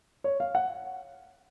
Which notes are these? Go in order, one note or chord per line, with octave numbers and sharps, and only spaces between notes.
C#5
F5
F#5